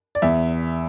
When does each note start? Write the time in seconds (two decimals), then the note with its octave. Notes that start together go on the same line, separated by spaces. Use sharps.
0.15 D5
0.22 E2 E5